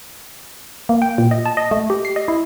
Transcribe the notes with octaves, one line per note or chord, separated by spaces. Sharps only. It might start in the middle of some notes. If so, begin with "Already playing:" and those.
A#3
G5
A#2
D#5
A5
D#5
A3
G4
C7
D#5
E4